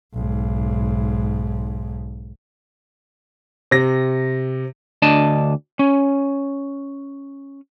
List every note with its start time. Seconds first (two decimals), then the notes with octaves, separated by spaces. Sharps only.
0.13 B1 G#2
3.71 C3 A#6
5.02 D2 D4 D#5 A5
5.79 C#4